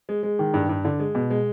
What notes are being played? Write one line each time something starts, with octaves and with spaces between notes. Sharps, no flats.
G#3
G#3
D#3
G2
G2
D3
G#3
B2
G#3